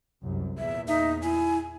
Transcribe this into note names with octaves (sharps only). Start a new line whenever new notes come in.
C2 F#2
E2 A#2 E5
D#4 E5
E4 G#5